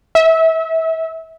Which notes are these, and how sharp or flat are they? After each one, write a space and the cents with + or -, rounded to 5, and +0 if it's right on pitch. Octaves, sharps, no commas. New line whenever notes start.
E5 -30